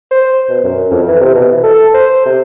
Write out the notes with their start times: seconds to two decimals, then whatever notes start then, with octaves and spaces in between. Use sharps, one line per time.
0.11 C5
0.49 B2
0.64 F#2
0.91 F2
1.08 E3
1.21 C3
1.35 B2
1.50 E3
1.63 A4
1.94 C5
2.26 C3